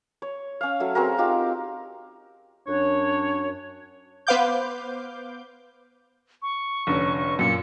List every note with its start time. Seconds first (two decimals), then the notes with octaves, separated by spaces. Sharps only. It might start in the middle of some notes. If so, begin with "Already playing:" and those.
0.22 C#5
0.61 C#4 F5
0.80 F#3 A3
0.95 C4 F#4 G#4 A#4
1.18 D#4 F4 G4
2.67 F#2 D4 C#5
4.27 B3 B4 C5 F5 D6 G6
6.42 C#6
6.87 F1 D3 C#4
7.18 C#6
7.39 F#2 A#2 C#7